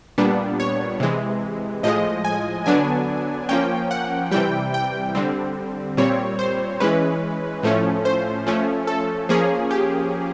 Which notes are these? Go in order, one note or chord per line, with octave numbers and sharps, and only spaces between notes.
A#2 G3 B3 D4
C#5
C3 E3 G#3
A2 F3 G#3 D#5
G#5
D3 F#3 B3 D4 G#5
F3 A#3 C#4 G5
F#5
C3 E3 G3 G5
G5
D3 G3 C4
A#2 G3 C4 C#5
C5
E3 G#3 C#4 B4
A2 F3 A3 C#4
C5
F3 A3 C#4
A4
F3 A#3 C#4 G#4
G4